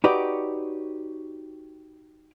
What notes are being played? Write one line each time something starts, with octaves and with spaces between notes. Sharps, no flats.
D#4 F#4 G4 B4 C#5 D5